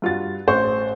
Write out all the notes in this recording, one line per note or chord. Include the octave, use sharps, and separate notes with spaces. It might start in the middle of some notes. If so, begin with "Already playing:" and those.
G2 F4 F#4 A6
A1 C5 F#5 C#6